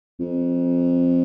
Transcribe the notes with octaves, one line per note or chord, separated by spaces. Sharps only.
F2